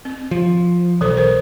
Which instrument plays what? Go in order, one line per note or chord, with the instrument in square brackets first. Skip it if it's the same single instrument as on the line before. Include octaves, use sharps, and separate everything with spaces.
[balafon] C4
[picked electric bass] F3
[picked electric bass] B1 [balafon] E3 A4 C5
[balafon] A#4 C5